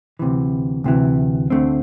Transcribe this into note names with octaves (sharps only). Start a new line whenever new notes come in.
D2 C3 E3
D2 C3 E3
D2 D3 A3 C4